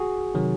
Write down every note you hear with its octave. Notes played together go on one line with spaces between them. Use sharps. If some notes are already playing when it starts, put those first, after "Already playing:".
Already playing: F#4 G#4
C3 D#3 F#3